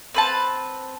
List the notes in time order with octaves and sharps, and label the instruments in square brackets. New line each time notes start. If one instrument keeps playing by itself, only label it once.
[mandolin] C4 B4 A5